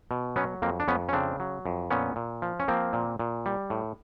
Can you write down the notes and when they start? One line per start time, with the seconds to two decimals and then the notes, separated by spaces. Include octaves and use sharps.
0.11 B2
0.36 F#3 B3 C#4
0.62 F2 A#3 C4
0.80 D4
0.88 F2 B3 C#4
1.09 C#4
1.13 C#3 C4 D4
1.40 F#3
1.66 F2
1.91 A#2 B3 C#4
2.16 A#2
2.42 F3
2.60 C#4
2.68 F3 A#3 C4
2.93 A#2
3.19 A#2
3.46 G3
3.70 A2